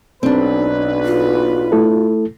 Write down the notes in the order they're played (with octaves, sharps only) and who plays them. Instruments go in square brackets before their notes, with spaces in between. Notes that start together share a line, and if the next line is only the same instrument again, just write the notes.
[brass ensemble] B1 B4 [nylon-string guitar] C4 D4 [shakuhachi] D#4
[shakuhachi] F4
[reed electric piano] A3 E4 A4